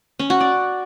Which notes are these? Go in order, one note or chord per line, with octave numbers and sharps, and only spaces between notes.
C#4
F#4
D5